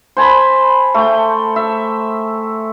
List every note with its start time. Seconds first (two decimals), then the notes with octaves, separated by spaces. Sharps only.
0.17 C5 G#5 A5 B5
0.94 A3 G5
1.56 E5